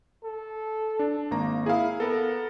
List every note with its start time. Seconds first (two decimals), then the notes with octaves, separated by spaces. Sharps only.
0.24 A4
0.99 D4
1.31 G#1 A#3 A#5
1.66 E4 G#4 F5
2.00 B3 A4 A#4